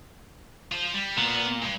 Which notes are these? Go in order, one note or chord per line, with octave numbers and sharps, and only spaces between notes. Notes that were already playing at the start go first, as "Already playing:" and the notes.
F4 C5
G3
A#2 B3
G2